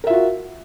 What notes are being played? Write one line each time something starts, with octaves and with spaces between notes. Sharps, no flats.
F4 F#4 A#4 E5